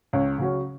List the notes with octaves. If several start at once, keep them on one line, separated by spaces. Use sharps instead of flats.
C#2 C#5
C#3 F#3 C#4